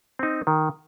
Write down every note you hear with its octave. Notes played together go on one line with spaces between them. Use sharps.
C4 D#4
D#3